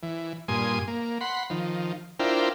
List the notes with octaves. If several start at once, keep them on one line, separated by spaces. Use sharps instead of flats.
E3
G2 A#2 G#5 C6 D#6
A#3
F#5 B5 C6
D#3 F3
D4 E4 F4 A#4 C5 G5